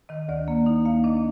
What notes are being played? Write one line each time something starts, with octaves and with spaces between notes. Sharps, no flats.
D#3 D#5
D2 D5
A#3
D#4
A#3 F5
D4 D#5